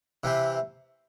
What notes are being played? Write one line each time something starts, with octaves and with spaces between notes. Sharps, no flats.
C3 E3 C4